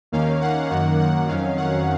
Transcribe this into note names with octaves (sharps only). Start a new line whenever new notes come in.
D#2 D#3 A#3 C#4 F5
F#5
F#2 D#3 A#3 F#5
F#5
F2 D#3 F#3 C#4 F5
F#5